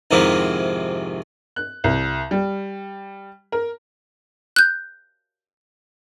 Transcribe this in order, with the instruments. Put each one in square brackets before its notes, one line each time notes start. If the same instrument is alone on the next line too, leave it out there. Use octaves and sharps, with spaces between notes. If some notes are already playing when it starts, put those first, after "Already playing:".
[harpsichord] F2 G#2 C3 D#3 E4
[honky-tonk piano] F#6
C2
G3
A#4
[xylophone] F#6 G6